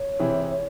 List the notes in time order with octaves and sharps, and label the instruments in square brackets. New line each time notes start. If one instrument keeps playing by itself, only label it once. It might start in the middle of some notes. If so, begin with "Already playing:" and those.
Already playing: [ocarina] C#5
[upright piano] C3 E3 C4 E4 G#4